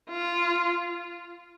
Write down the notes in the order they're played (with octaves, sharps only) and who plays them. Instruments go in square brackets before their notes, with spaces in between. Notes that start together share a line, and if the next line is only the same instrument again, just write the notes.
[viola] F4